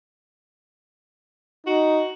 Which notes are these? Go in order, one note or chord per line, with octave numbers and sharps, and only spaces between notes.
D#4 F#4